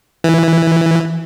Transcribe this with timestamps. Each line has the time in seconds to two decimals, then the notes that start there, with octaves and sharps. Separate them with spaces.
0.24 E3